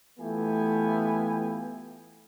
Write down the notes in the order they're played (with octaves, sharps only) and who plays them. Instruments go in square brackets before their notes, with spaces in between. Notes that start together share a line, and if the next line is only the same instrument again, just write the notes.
[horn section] E3 A3 B3 F4 G4 G#5